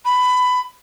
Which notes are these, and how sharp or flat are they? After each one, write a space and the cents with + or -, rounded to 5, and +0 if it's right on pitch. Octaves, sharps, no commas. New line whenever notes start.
B5 +15